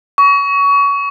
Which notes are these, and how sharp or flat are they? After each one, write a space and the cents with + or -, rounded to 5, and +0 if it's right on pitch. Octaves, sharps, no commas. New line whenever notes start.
C#6 +25